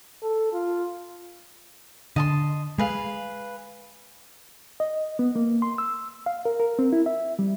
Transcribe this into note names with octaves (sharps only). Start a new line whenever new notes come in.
A4
F4
D3 D#5 A5 C6
G#3 G#4 B4 F5
D#5
B3
A#3
C6
E6
F5
A#4
A#4
C4
E4
E5
G3